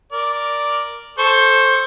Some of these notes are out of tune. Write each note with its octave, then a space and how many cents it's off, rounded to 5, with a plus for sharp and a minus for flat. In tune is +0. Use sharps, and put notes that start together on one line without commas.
A#4 +0 D5 +0
A4 -5 C5 +10 C#6 +0